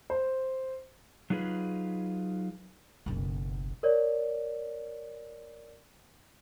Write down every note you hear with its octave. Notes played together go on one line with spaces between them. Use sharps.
C5
F#3 D#4 F4 G#4 B4
F#1 B1
A#4 C#5 D5